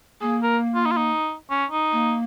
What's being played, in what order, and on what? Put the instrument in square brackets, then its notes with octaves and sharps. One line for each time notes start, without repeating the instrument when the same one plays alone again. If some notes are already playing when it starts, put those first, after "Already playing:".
[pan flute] A#3 [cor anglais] G#4
[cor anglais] A#4
F4
D#4
F4
D#4
C#4
D#4
[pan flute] A#3